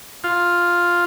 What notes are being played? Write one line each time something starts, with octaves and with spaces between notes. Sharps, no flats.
F4